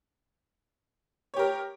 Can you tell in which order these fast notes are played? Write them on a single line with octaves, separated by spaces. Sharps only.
C#5 G4 A#4